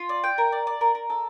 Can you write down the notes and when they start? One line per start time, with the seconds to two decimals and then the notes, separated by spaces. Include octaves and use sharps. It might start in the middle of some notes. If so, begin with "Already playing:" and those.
Already playing: F4
0.09 D5
0.24 G5
0.38 A#4
0.52 D5
0.67 D5
0.81 A#4
0.95 A#4
1.10 A4